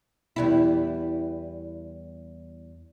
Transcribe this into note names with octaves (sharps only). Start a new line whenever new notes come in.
E2 G3 E4